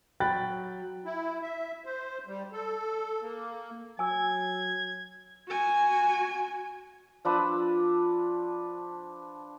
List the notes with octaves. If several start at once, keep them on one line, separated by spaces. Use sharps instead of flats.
F#3 G5 B5 F#6 A6
E4
E5
C5
G3
A4
A#3
F#3 G#5 E6 G#6
F#4 G#5
F3 D4 B4 E6